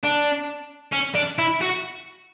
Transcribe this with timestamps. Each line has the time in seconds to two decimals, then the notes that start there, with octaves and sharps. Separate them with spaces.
0.03 D4
0.93 C#4
1.15 D4
1.39 E4
1.61 F#4